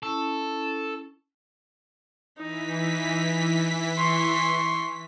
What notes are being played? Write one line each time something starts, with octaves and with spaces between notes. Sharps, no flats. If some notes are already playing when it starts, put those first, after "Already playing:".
C#4 E4 A4 C#6
E3 D#4 B6
C6 C#6